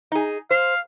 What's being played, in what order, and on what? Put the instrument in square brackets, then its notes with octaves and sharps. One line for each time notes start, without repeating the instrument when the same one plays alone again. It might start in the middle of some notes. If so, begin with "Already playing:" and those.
[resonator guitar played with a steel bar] D#4 G#4
[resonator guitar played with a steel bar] C5 [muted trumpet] F5